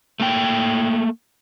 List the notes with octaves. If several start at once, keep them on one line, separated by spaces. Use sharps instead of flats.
A3 A#3 G5